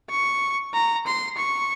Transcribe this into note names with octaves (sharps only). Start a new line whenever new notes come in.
C#6
A#5
C6
C#6